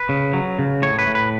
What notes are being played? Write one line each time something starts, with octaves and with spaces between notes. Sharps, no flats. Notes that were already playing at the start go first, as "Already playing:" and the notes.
Already playing: B4
C#3
F#3
C#3
A2 C#5
B4
A2
B4